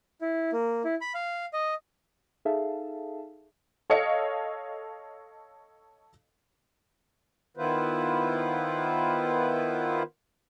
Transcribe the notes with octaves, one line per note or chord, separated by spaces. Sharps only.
E4
A#3
E4
B5
F5
D#5
D#4 G#4 A4 E5 F5 A5
A4 C#5 D#5 F5 C#7
D#3 B3 E4 F4 B4 C5